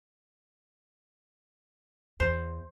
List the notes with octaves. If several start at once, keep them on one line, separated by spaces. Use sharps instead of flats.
E2 C5